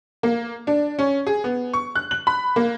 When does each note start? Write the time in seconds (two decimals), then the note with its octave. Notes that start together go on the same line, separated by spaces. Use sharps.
0.23 A#3
0.67 D4
0.99 C#4
1.27 G#4
1.44 B3
1.74 C#6
1.95 F#6
2.11 F#7
2.27 B5
2.56 A#3